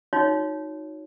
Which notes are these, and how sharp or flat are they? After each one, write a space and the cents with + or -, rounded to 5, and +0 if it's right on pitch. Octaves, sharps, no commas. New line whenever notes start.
D#4 +5 F#4 -35 C#5 +15